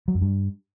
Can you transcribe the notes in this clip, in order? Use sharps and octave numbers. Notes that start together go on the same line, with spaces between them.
F#3
F#2
G2